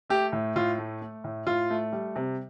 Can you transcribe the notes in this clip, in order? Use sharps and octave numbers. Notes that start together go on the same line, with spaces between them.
A3 G4
A2
A2 F4
A3
A3
A2
A2 F4
A3
G3
C3